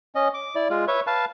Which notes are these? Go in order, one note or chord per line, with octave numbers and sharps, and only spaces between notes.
C#4 D#5
D6
E4 D5
G#3 F4
B4 C#5 E5
B4 F5 A5